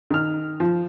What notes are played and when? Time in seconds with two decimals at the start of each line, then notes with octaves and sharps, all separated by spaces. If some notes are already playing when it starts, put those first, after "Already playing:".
0.11 D#3 F6
0.60 F3